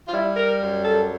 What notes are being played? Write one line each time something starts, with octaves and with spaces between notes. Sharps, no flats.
F4
G3 E4
A#4
F#2
A4